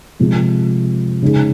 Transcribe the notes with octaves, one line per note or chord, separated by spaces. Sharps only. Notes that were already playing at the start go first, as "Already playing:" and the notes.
C3 F3 G#3
C#3 G#3 D#4 G#4